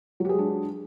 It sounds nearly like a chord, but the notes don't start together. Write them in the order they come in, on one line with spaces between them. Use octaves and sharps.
F#3 G4 G#4 G#3 D4